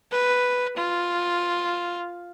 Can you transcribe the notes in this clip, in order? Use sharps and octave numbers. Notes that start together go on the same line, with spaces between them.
B4
F4